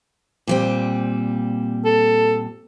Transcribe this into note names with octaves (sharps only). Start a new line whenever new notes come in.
A#2 G3 C4
A4